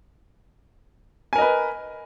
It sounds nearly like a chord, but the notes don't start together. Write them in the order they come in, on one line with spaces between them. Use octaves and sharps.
G#5 A#4 D#5 B4